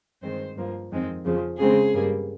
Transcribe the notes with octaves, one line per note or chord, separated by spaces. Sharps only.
G2 D#3 G#3 C4 C5
G2 F3 A#3
F2 D#3 G#3 C4
F2 C#3 F3
C#3 G#3 C4 G#4
G2 G3 A#3